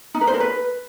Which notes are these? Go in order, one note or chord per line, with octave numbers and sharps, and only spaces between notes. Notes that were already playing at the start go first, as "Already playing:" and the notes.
D#4
B4
C5
A#4
B4